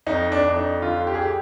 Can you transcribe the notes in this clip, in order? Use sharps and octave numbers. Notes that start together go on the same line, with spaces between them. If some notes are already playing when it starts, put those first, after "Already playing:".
F2 D#4
D4
F2
D#4
D3 F4
G4
G#4
G4